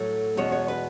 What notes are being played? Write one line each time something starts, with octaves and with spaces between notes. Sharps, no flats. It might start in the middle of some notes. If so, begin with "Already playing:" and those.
Already playing: A2 F#3 A3 C#5
E2 B2 G#3 C#5
C#5
B4